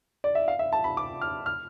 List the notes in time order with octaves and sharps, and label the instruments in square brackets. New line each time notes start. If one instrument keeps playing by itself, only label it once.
[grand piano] D5
E5
F5
E5
A5
B5
D6
F6
F6